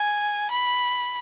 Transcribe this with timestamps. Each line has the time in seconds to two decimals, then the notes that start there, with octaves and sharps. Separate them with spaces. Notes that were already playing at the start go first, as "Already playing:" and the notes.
Already playing: G#5
0.51 B5